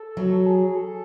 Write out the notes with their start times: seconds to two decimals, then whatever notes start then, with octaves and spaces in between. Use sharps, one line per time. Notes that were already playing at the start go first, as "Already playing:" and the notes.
Already playing: A4
0.17 F#3
0.46 G#4
0.76 A4